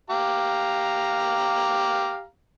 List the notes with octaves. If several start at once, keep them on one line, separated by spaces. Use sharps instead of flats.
G4 F5 A#5